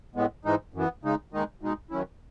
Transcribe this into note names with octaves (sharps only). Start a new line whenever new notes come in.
A2 G#3 B3
G#2 E3 G#3 D#4
F#2 E3 B3
C#3 G#3 D#4
D#2 D#3 G#3 D#4
B2 G#3 D#4
D#3 F#3 C#4 E4